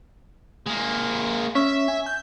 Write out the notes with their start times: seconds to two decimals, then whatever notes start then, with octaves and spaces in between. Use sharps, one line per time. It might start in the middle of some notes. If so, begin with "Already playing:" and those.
0.67 G#3 A#3
1.55 C#4 E5
1.88 G#5
2.06 G6